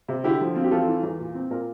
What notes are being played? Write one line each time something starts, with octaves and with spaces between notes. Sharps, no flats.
C3
D3 E4 G4
F3
C4 F4
G4
E2 F4 A4
E3
E2
A#2
C4
A#2 A#4